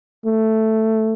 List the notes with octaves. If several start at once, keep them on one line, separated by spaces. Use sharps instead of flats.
A3